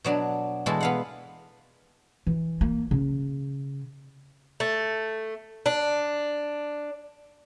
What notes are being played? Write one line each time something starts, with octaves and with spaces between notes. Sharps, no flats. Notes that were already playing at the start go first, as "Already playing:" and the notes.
B2 F#3 D4
B2 E3 G#3 A4
B3 F5 F#5
E3
A#3
C#3
A3
D4